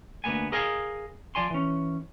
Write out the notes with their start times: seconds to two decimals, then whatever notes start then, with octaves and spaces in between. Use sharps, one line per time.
0.24 D2 F#3 A#3 B3 G#5
0.52 G#4 A#4 D#5 F5 G#5
1.35 F3 D5 G#5 C6
1.50 E3 C#4